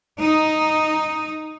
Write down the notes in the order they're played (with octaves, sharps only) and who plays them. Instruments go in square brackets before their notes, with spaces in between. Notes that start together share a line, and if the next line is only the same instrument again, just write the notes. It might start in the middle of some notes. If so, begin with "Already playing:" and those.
[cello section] D#4